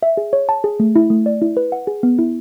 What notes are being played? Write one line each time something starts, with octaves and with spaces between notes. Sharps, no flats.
E5
G#4
C#5
A5
G#4
A3
E4
A3
D5
E4
B4
F#5
G#4
B3
E4